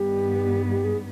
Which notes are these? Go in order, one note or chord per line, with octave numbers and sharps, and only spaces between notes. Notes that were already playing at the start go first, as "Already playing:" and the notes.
Already playing: G2 D#3 G3 B3 G4
G4
G#4